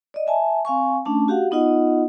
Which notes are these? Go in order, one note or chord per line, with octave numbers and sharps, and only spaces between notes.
D5 D#5
E5 G#5 A5
C4 F5 G#5 C#6
A3 C#4 D4 A5
F#4 G4 F5 F#5
B3 D#4 F4 D#5 F#5